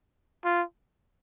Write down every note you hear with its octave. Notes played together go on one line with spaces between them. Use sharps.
F4